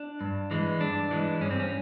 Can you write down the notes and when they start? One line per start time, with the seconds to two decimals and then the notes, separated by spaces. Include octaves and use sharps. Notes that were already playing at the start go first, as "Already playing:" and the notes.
Already playing: D4
0.21 G2
0.51 E3 G#3
0.81 G2 D4
1.11 E3 G#3
1.41 G2 C#4
1.50 C4
1.60 C#4